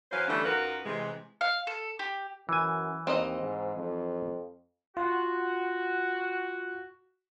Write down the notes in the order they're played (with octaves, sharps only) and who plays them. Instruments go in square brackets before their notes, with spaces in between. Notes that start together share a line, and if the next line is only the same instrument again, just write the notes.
[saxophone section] E3 F#3 C#4 B4 C5 F5
D3 E3 G3 A3 C#4 D4
F#2 D#4 F4 F#4 A#4 B4
C3 E3 G#3
[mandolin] F5
A4
G4
[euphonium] F#2 [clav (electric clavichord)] E3 G#5
[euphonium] D#2 [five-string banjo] C4 D#4 D#5
[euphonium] G#2
F2
[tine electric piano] F4 [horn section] F#4